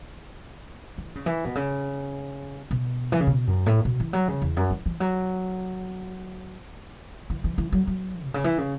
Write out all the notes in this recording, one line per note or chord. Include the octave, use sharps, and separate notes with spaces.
E3
C#3
E3
B2
C#3
B2
E3
C#3
B2
F#2
A2
B2
E3
F#3
C#3
E2
F#2
E3
E3
F#3
E3
E3
E3
F#3
F#3
B2
C#3
E3
C#3